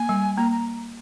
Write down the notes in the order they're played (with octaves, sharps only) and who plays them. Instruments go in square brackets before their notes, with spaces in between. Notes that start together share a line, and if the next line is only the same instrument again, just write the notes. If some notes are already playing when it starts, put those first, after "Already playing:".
Already playing: [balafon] A#3 [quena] G#5
[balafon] G3
[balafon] A#3 [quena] A#5
[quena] A#5